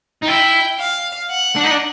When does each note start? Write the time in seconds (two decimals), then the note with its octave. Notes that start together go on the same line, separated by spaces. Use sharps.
0.22 D#4
0.27 E4 G5
0.79 F5
1.30 F#5
1.56 D4
1.64 D#4
1.71 D4